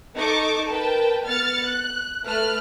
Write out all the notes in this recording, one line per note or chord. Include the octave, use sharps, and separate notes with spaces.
D#4 A4 C#6 D6
A#4 B4 G5 A5
B3 F6 A6 C#7
F#6
A3 B4 F6 F#6